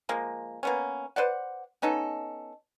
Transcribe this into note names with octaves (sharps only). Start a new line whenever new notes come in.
F3 G#3 A#3
A#3 B3 C#4
B4 C5 D5 F#5
B3 C#4 D#4 A4